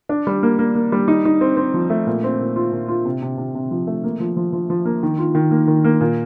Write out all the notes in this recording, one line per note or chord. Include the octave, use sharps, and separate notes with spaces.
D4
G3
A#3
A#3
A#3
G3
D#4
D#4
C4
C4
F3
A3
A#2
C4
A#2
F4
A#2
F4
C3
C3
C3
C3
F3
A3
A#3
F3
F3
F3
F3
A#3
D#3
F4
D#3
A#3
D#3
A#3
A#2